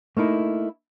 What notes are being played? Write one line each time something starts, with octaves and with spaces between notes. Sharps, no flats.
A3 A#3 D#4 E4